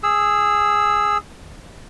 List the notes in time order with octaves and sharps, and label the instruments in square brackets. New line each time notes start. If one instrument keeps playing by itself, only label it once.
[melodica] G#4 E6